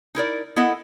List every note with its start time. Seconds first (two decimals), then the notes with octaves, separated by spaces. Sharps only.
0.15 D#4 E4 A#4 D5
0.56 B3 E4 A4 D#5 F#5